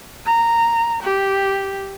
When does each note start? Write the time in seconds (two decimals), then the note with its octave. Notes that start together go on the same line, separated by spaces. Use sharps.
0.25 A#5
1.03 G4